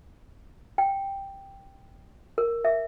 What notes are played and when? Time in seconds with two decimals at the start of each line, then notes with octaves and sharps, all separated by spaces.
0.78 G5
2.38 A#4
2.65 E5